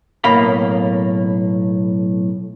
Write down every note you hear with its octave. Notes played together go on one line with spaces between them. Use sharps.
B1 A2 A#3 D#5 F5 B5